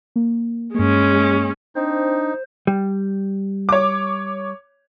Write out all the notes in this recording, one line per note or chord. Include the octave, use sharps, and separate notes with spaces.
A#3
G2 G#3 A#3 C#4
C4 D4 D#4 C5
G3
C#5 D6